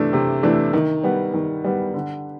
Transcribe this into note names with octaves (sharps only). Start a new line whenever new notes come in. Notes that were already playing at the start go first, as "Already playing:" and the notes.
Already playing: C3 E3 A3 D4
C3
E3 A3 D4
D#3
G3 B3
D#3
G3 B3
D3